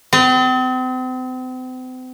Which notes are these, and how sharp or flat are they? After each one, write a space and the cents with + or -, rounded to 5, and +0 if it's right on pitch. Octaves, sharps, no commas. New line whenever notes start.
C4 -40